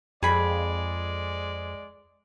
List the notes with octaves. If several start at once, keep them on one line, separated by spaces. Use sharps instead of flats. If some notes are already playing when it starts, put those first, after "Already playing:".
F2 G#3 G#4 D5 B5